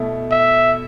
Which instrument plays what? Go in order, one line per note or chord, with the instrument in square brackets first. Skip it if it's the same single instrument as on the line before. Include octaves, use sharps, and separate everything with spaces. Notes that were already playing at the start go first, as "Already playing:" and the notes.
Already playing: [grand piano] B2 A3 E4 A4
[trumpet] E5